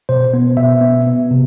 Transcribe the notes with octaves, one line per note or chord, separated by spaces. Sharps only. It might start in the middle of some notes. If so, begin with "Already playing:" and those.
B2 C5
B3
B2 E5
B3
B3
C3